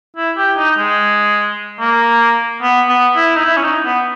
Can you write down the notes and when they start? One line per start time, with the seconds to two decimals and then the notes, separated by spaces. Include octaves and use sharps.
0.17 E4
0.37 G4
0.58 D#4
0.78 G#3
1.80 A#3
2.62 B3
2.89 B3
3.16 E4
3.36 D#4
3.44 E4
3.57 C#4
3.64 D#4
3.84 B3